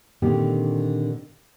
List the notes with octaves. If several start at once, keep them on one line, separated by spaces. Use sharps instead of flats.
A#2 D3 D#3 C4 D4 G4